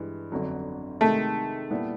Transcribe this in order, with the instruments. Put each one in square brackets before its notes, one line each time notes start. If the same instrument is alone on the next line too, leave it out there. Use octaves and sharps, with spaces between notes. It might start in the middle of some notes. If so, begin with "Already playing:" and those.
Already playing: [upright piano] G2 E3 G#3
G1 F2 D3 F#3
[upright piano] C3 D#3 G#3 [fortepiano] A3
[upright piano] A#2 G3 B3 E4